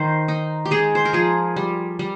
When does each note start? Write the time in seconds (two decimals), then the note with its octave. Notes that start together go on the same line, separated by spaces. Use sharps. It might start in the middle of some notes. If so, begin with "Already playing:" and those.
Already playing: D#3 C5
0.28 D#4
0.65 G4
0.71 G#3 G#4
0.95 C5
1.05 A#4
1.13 F3 G#4
1.56 G3
1.99 G3